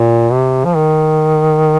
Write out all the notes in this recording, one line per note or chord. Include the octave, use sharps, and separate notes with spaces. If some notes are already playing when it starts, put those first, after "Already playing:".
Already playing: A#2
C3
F3
D#3